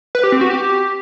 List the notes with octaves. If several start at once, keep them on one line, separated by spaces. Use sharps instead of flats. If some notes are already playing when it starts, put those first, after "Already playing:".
B4
G4
C4
F#4
G4